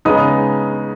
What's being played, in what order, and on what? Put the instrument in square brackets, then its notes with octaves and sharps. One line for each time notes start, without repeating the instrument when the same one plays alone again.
[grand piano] C#3 G#3 B3 D#4 D#6